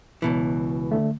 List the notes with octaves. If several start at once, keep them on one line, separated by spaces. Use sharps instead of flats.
C#2 B2 E3
D3 A3